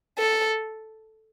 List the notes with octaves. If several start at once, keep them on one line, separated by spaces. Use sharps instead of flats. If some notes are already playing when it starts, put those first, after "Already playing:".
A4